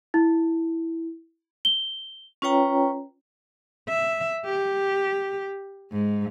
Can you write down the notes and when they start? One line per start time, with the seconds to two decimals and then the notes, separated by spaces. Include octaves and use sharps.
0.14 E4
1.65 G7
2.42 C#4 F4 B4 C#5 G5 A#5
3.89 E5
4.46 G4
5.92 G#2